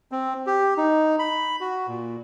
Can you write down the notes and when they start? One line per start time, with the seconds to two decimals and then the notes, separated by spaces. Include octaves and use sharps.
0.12 C4
0.46 G4
0.77 D#4
1.19 B5
1.61 F#4
1.87 A#2